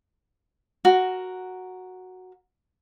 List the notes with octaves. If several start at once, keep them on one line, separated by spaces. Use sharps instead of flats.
F#4 A#4